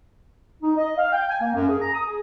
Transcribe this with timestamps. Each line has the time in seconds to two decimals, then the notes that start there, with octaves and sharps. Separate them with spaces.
0.62 D#4
0.76 D#5
0.97 F5
1.13 G5
1.29 G#5
1.41 A#3
1.54 F#2
1.69 G#4
1.81 A#5
1.95 D#6
2.07 G#4